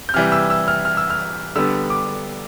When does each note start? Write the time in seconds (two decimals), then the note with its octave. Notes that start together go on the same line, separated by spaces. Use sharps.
0.09 G6
0.14 C3 E3 G3 F6
0.32 E6
0.50 E6
0.68 F6
0.85 F6
0.97 E6
1.10 F6
1.56 D3 G3 B3 E6
1.90 D6